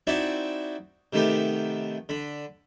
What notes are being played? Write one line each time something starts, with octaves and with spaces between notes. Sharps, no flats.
C4 D#4 E4 F#4 D5 E5
C3 D#3 A3 B3 G4
D3 B5